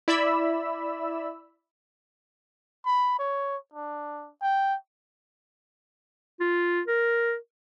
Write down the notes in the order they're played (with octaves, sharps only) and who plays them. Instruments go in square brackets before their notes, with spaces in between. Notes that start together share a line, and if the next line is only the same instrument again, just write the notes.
[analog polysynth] E4 D5 E5 B5 E6
[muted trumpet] B5
C#5
D4
G5
[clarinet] F4
A#4